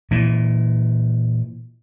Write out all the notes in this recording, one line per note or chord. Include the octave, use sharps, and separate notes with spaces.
A#2 E3